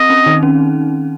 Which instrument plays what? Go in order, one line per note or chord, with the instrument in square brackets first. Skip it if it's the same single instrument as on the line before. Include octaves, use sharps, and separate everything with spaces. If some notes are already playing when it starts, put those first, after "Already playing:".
Already playing: [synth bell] C4 [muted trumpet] D#5
[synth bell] C#4
D#3 D#4
C#4